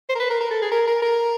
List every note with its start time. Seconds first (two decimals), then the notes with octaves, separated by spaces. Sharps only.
0.09 C5
0.15 A#4
0.20 B4
0.30 A#4
0.41 A#4
0.51 A4
0.62 G#4
0.72 A#4
0.87 A#4
1.02 A#4